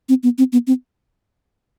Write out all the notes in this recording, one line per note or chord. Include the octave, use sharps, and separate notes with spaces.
C4
B3
C4
B3
C4